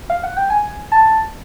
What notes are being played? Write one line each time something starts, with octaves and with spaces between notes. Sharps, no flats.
F5
F#5
G5
G#5
A5